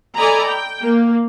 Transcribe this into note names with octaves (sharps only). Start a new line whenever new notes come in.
A4 D5 D#5 G#5 A#5 B5
G5
A#3